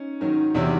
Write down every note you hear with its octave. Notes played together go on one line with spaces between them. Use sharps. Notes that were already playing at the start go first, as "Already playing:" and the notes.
Already playing: C#4 D#4
G#2 D#3 F#3
E2 C3 D#3 F#3 D4 E4